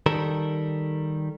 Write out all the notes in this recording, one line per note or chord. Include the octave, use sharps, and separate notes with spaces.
D#3 G3 A4 A#4